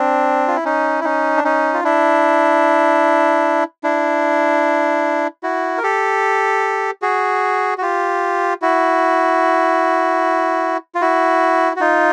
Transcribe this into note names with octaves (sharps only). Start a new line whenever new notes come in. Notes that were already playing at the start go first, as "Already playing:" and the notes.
Already playing: C4 D4
F4
E4
C#4 D#4
E4
C#4 D#4
D4
C#4 D#4
F4
D4 E4
D4 E4
E4 F#4
A#4
G4 A4
F#4 G#4
F#4
F4 G4
E4 F#4
F4
E4 F#4
F#4
D#4 F4